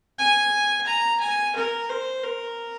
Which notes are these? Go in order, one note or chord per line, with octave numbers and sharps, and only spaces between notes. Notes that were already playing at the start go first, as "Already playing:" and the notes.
G#5
A#5
G#5
A#4
C5
A#4